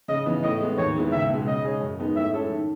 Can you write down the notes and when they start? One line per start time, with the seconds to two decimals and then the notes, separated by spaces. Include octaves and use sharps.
0.08 C#3 D#5
0.26 E3 B3
0.43 A2 D#5
0.60 G#3 B3
0.78 D#2 C#5
0.95 D#3 G#3 B3 E4
1.12 C#2 E5
1.30 B2 G#3
1.47 C#3 D#5
1.64 G#3 C#4 G#4
1.81 F#2
1.98 D#3 G#3 B3 D#4
2.16 A2 E5
2.33 G#3 C#4 E4 A4
2.50 D#3